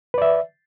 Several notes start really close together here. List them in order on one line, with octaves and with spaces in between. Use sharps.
B4 D5 E5